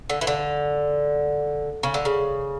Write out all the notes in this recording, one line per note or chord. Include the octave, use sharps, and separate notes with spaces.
D3
E3
D3
C#3
D3
C#3